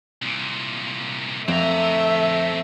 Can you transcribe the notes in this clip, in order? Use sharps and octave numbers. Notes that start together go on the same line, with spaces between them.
C2 A#2
F2 A3 C4 E5 A#5